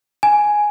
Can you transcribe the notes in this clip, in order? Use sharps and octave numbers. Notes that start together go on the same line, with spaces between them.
G#5